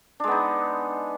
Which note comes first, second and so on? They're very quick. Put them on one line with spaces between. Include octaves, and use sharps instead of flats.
D4 G#3 B3 D#4